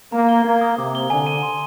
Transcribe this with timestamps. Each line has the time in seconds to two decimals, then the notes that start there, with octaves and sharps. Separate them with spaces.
0.12 A#3 A#5
0.29 G7
0.45 A#3 G#6
0.61 D#6
0.78 C3 D6
0.95 G7
1.10 D3 G#5
1.26 D#7
1.43 C6